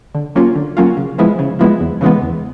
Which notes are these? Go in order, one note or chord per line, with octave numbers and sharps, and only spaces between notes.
D3
F#3 A#3 C#4 F4
D3
F#3 A#3 C#4 F4
C#3
F3 G#3 B3 E4
C#3
F3 G#3 B3 E4
E2
C#3 E3 G#3 B3
E2